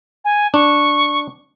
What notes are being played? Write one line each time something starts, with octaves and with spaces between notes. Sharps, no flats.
G#5
D4 C#6